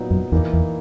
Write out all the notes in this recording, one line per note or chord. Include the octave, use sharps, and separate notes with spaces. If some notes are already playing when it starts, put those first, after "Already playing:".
Already playing: A#2 F#3 B3 D#4
F#2
E2 E3 A#3 D#4
E2